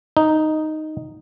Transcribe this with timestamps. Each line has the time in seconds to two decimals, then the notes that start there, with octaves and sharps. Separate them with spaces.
0.17 D#4